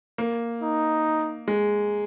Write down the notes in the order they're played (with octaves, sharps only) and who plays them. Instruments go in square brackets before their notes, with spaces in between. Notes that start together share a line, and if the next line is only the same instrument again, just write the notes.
[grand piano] A#3
[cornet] D#4
[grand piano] G#3